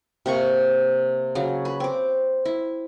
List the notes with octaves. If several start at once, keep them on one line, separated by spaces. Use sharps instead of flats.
C3 A#3 C#6
C#3 F#3
B4
C4 D6
E4